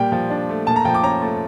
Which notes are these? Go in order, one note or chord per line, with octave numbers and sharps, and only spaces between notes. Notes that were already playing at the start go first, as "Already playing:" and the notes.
Already playing: A#2 G3 G5
F3
D4
A3
A#2 A5
A#5
F3 G5
D6
C#4 A#5
A3